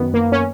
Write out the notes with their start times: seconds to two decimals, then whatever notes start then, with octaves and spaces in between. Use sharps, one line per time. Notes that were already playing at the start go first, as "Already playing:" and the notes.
Already playing: F#2 D#3 B3
0.14 A#3
0.32 C#4